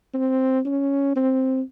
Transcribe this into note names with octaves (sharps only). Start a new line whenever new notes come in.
C4
C#4
C4